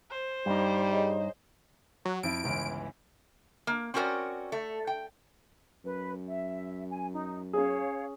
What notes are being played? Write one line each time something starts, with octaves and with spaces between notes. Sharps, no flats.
C5
G2 G3 D#4
G#4 C#5 D#5
F#3
F2 E4 D7
G1 C#2 E3
A#3
C4 C#4 F#4 A#4 D5
A3
G5
F#2 B4
E5
G#5
D#4
C#4 G#4 C#5 F5